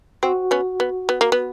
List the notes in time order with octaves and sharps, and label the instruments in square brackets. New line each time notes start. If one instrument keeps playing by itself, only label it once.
[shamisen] C4 [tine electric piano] F#4
[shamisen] B3 C#4
B3
B3
A#3
B3